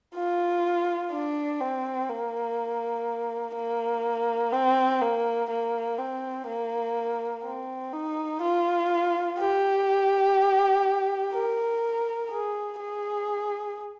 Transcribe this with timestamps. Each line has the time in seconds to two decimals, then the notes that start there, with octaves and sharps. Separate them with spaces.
0.15 F4
1.12 D4
1.60 C4
2.09 A#3
3.55 A#3
4.52 C4
5.01 A#3
5.50 A#3
5.98 C4
6.47 A#3
7.44 C4
7.93 D#4
8.42 F4
9.39 G4
11.33 A#4
12.30 G#4
12.79 G#4